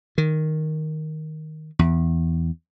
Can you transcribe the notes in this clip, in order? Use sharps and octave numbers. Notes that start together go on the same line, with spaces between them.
D#3
E2